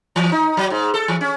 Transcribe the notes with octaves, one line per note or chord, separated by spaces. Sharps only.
E3
D#4
F#3
G#2
A4
E3
C#4